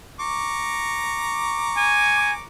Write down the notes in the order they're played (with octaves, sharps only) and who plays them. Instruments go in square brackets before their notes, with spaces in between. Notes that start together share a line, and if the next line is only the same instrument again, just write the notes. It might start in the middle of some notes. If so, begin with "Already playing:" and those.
[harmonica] A#5 C#6 D6
[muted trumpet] G#5